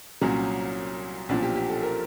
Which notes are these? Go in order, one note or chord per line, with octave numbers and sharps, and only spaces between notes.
C2 A#2 F#3 C#4
B1 A#2 F3 D4
G4
G4
A4
A#4